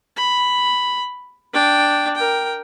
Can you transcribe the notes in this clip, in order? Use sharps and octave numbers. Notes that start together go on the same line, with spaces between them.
B5
D4 G5
A#4 G5